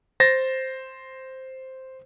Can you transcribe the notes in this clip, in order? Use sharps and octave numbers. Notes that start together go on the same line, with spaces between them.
C5 A6 A#6